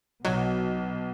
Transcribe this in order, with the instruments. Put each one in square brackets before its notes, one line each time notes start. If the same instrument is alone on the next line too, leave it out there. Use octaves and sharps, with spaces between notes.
[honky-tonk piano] B1 [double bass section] B2 [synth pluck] F#3